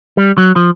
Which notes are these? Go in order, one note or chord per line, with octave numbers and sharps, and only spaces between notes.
G3
F#3
F3